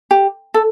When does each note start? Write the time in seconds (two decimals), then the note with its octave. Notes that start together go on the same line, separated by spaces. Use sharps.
0.11 G4
0.54 A4